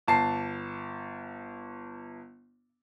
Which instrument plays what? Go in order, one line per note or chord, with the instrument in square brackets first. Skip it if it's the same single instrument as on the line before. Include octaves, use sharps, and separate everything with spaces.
[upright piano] G1 A5 C7